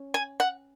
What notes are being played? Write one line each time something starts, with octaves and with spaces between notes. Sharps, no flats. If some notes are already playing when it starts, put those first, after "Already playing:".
Already playing: C#4
G#5
F#5